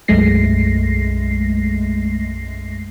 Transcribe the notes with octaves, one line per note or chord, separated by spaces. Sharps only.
B1 F#2 G#3 A3 A#6 C7